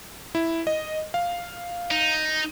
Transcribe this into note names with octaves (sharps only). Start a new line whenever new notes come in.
E4
D#5
F5
D#4